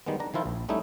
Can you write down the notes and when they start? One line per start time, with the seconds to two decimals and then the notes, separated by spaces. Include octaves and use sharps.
0.06 D#3 G3 G#3 B3
0.20 D4 A#5
0.34 D#3 F3 E4 F4 G5
0.46 A#1
0.69 G3 A3 C#4 D#4 E4